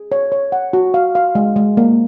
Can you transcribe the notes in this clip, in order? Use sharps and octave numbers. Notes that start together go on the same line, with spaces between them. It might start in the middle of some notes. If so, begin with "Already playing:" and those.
Already playing: G#4
C#5
C#5
F#5
F#4
F5
F5
G#3
G#3
A#3